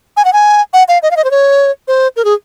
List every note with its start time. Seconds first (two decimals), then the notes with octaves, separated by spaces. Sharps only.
0.17 G#5
0.25 F#5
0.33 G#5
0.74 F#5
0.88 F5
1.03 D#5
1.11 F5
1.17 D#5
1.24 C5
1.31 C#5
1.88 C5
2.16 A#4
2.25 G#4